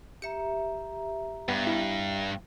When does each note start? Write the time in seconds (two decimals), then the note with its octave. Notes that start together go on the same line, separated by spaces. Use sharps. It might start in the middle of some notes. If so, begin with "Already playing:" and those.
0.22 G4 E5 A#5 C#7
1.48 G2 B3
1.67 E4